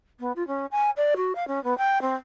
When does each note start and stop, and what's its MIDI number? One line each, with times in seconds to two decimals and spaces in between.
0.20 0.32 59
0.36 0.46 65
0.47 0.66 61
0.71 0.90 80
0.96 1.14 74
1.16 1.33 66
1.35 1.47 77
1.47 1.62 61
1.64 1.76 59
1.78 2.01 79
2.01 2.15 60